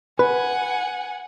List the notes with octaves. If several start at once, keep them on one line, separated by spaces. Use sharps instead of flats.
B4 F#5 G#5